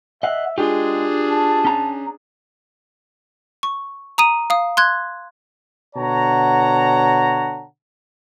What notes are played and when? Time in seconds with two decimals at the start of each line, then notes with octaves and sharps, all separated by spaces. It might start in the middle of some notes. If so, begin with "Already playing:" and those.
0.23 D#5 E5 F#5
0.58 G#3 D4 F4 G4 G#4
1.31 A5
1.65 C#4 A#5
3.63 C#6
4.18 A#5 D#6 D#7
4.50 F5 D#6
4.77 C6 F#6 G#6
5.96 B2 D3 C#5 F#5 A5 A#5